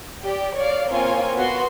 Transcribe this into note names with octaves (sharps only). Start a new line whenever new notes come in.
G4 D5
C#5 D5 F5
A#3 C4 F4 C#5 F5 G#5
B3 F#4 C6